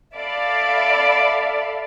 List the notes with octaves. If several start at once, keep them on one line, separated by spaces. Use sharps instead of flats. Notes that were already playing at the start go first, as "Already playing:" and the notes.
A4 D5 E5 F5 B5